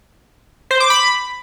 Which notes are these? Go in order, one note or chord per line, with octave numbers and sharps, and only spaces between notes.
C5
D6
B5